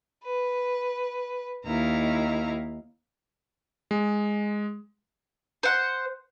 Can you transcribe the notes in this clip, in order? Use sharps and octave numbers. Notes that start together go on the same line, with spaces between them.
B4
D#2 D#4 E4 F5 A#5
G#3
C5 F#5